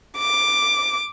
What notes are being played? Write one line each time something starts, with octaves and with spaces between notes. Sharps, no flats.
D6